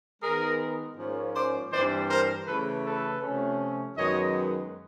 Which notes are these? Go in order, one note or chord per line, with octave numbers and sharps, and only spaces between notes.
D#3 G#3 B3 G#4 A#4
G#2 F3 A#3 C#4
C5 D5
G2 E3 G3 C4 C5 D5
A#4 C5
C#3 E3 A3 A4 B4
A4 B4
C3 F3 A3 C#4
F#2 D#3 G#3 B3 C#5 D#5